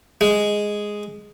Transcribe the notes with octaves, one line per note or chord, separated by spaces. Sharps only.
G#3